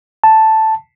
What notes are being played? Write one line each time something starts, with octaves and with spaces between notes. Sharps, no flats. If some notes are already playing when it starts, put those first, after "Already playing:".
A5